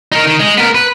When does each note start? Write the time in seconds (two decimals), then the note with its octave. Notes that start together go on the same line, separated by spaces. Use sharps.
0.12 D#4 A#4
0.26 D#3
0.40 G#3
0.57 B3 A#4
0.75 B4